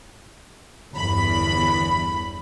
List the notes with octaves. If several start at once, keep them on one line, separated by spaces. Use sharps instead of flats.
G1 E2 B5